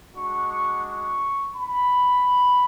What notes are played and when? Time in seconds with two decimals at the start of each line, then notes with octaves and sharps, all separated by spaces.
0.14 G#3 D4 F#4 C#6
0.49 C#6
0.85 C#6
1.56 B5